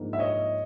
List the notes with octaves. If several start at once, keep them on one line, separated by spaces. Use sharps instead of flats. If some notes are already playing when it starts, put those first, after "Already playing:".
Already playing: G#2 F3 A#3 D4
E5
C#5 D#5